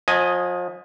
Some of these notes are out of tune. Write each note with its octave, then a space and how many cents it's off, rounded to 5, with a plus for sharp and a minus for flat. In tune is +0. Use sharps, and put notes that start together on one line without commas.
F3 +35 D#5 +0 G#5 +0